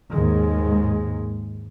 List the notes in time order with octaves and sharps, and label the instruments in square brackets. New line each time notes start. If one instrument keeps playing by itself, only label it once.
[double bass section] D#2 G#2 D#3 G#3